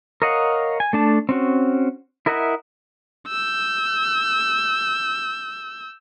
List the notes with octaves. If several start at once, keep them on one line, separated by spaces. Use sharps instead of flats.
A#4 C#5 D#5 F5 F#5
G#5
A3 D4 A5
C4 C#4 F#4
E4 A#4 D#5 E5 F#5
E6 G6